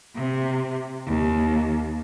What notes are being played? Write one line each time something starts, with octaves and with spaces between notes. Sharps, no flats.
C3
D#2